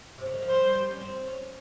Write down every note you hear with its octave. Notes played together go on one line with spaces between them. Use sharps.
C3
C#3
D#3
F3
G3 C5
G3
C#4
C4
C#4